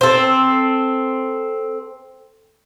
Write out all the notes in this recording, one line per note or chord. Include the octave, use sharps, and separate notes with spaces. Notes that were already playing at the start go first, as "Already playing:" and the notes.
C4 A4